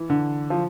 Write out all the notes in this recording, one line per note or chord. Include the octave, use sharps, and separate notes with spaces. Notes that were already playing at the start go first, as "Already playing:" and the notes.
Already playing: E3
D3
F3